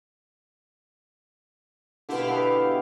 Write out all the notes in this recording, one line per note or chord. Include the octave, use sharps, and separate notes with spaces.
B2 D3 E4 G4 F5
B3 A4